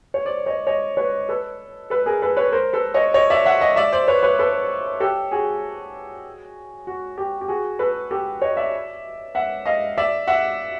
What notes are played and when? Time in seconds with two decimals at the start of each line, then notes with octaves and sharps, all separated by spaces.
0.14 C#5
0.25 C5 D5
0.46 C#5 D#5
0.67 C#5 D#5
0.97 B4 C#5
1.29 A4 B4
1.90 A4 B4
2.06 G#4 A#4
2.22 A4 B4
2.37 B4 C#5
2.52 A#4 C5
2.73 A4 B4
2.94 C#5 D#5
3.14 C#5 D#5
3.30 D5 E5
3.46 E5 F#5
3.61 D#5 F5
3.76 D5 E5
3.92 C5 D5
4.08 B4 C#5
4.23 B4 C#5
4.39 A4 B4
5.00 G4 A4
5.31 F#4 G#4
6.87 F#4
7.18 G4
7.41 G4
7.48 F#4 G#4
7.79 A4 B4
8.11 G4 A4
8.42 C#5 D#5
8.57 D5 E5
9.35 E5 F#5
9.66 D#5 F5
9.98 D5 E5
10.27 E5 F#5